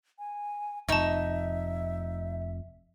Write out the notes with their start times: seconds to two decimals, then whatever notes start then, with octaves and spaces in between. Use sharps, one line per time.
0.19 G#5
0.89 F1 F2 D#4 D#5 E5 A5 C#6